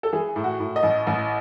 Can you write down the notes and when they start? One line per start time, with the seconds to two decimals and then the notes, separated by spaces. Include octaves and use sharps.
0.03 A4
0.13 E3 G#4
0.36 A2
0.44 F#4
0.60 A2
0.76 D#5
0.83 A1
1.07 A1